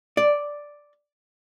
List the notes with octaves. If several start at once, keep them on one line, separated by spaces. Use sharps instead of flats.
D5